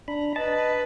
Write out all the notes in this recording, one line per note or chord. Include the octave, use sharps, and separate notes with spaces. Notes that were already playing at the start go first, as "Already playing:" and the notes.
D4 A#5 B5
B4 D#5 A5